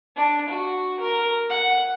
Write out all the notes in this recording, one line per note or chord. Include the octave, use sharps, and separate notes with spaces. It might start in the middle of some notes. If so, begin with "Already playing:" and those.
D4
F#4
A#4
F#5